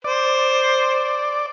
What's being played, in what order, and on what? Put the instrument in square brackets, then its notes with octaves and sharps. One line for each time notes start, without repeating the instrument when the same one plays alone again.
[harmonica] C5 [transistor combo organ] D5